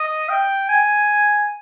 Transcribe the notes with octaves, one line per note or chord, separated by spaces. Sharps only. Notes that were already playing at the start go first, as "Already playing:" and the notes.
Already playing: D#5
G5
G#5